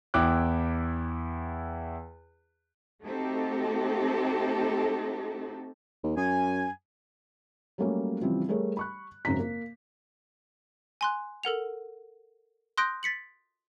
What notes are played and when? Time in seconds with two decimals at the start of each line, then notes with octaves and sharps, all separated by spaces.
0.14 E2 E4 G5 D6 F#6
3.03 A3 C4 D#4 F#4 G4 A4
6.04 D#2
6.17 F#2 G#5
7.78 F#3 G3 A3 A#3 C#4
8.21 C#3 E3 F3 G3 C4
8.48 G3 A3 G#4 A#4 C#5
8.77 B5 C#6 F#6
9.25 G#1 F#2 C#3 C4 A#5 B6
9.39 A#3
11.01 G#5 C6 F#6
11.43 A4 A#4 F#5 F7
12.78 C6 D#6 F#6 G6 A#6 D7
13.03 A6 B6 C#7 F#7